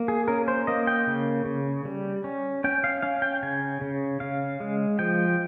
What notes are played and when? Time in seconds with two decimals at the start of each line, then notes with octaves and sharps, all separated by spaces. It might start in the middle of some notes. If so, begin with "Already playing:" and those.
Already playing: A#3
0.08 G#4
0.28 C#4 A#4
0.48 C5
0.67 A#3 D#5
0.87 G5
1.07 C#3
1.46 C#3
1.85 G3
2.24 C#4
2.64 C#4 G5
2.84 F5
3.02 C#4 F5
3.22 G5
3.43 C#3 G#5
3.81 C#3
4.20 C#3 F5
4.60 G#3
4.99 F3 G5